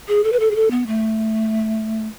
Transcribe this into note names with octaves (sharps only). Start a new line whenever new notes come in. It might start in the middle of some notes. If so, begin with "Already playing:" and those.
G#4
A4
B4
A4
G#4
A4
B3
A3